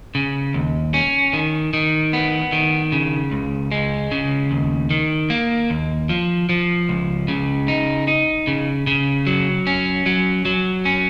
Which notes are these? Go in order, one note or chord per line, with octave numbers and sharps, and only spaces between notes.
C#3
D#2
C#4
D#3
D#3
B3
D#3
C#3
C#2
G#3
C#3
D#2
D#3
A#3
D#2
F3
F3
C#2
C#3
D#4
D#4
C#3
C#3
F#3
C#4
F#3
F#3
C#4